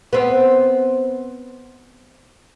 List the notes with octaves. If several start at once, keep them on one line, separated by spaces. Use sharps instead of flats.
B3 C4